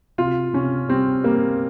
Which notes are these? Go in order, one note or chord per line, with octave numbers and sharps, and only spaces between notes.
C3 F4
C3 C#4
G3 C4
G3 A#3